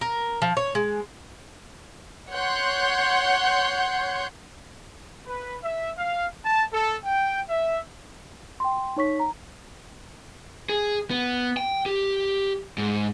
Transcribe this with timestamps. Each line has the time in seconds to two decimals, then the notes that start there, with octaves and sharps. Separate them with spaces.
0.01 A#4
0.42 F3
0.57 C#5
0.75 G#3
2.32 C#5 F#5 C6 G6
5.27 B4
5.63 E5
5.97 F5
6.44 A5
6.72 A4
7.03 G5
7.49 E5
8.60 G5 C6
8.97 D#4 C#5 C#6 B6
9.20 A#5
10.69 G#4
11.11 B3
11.57 G5
11.86 G4
12.78 G#2